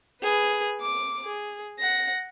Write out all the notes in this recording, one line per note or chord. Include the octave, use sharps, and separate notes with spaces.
G#4 B4
D6
G#4
F#5 A#6